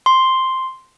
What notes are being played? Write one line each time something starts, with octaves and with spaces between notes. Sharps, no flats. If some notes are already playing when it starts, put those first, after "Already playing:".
C6